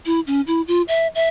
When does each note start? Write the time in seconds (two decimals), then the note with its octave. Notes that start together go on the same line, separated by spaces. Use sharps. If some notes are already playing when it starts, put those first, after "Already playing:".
0.06 E4
0.27 C#4
0.47 E4
0.68 F4
0.88 E5
1.15 E5